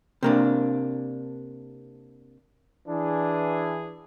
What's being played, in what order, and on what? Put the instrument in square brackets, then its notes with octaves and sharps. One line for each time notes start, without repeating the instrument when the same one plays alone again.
[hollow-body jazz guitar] C3 A#3 D4
[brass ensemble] E3 G#4 [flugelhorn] D4